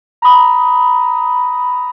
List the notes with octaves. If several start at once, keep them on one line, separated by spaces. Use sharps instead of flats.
A#5 B5 D#6